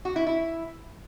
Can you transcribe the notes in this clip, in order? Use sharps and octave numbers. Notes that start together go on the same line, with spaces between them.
F#4
E4
E4